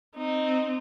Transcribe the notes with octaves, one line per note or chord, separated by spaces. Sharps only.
C4 D#4